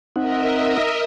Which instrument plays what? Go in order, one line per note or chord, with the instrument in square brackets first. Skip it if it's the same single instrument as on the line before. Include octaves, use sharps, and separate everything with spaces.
[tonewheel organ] C4 D#4 F#5 [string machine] A#4 D#5 E5